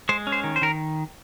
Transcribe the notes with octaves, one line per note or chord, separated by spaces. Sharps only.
G#3 C5
C#4
C5
D#3
C5
D#3 A#4